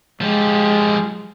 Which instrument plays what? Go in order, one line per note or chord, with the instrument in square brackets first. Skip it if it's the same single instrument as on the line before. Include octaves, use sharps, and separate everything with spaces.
[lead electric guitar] F3 G4 [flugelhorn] G#3